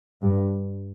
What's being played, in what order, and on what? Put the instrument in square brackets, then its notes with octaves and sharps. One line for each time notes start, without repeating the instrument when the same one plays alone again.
[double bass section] G2